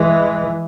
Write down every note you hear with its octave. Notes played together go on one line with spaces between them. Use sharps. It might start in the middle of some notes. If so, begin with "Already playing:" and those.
Already playing: E3 G#3